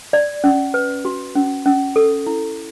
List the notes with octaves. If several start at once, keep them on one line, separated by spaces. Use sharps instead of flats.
D5
C#4
B4
F#4
C#4
C#4
A4
E4